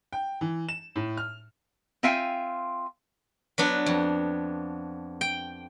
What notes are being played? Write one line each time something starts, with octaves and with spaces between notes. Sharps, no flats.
G5
E3
E7
A2
F6
C4 F4 E5 F5 G5 G#5
F#3 B3 D4
F2
G5